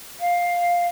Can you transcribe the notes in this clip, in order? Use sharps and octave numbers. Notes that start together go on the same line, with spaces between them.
F5